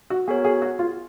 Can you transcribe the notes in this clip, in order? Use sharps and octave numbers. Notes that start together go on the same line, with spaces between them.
F#4
B3 F#4 G#4 A#4 C#5
G#4
F#4
F4